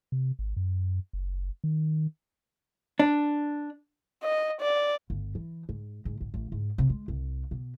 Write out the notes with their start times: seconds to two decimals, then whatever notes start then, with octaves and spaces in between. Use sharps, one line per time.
0.12 C3
0.39 G#1
0.57 F#2
1.13 F#1
1.64 D#3
3.00 D4
4.23 D#5
4.61 D5
5.10 G1
5.35 E3
5.69 G#2
6.05 G#2
6.21 A1
6.34 A1
6.52 G#2
6.78 C3
6.90 G#3
7.08 C2
7.51 B2